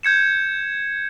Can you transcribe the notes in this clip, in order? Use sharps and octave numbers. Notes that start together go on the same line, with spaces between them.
G6 G#6 C#7 E7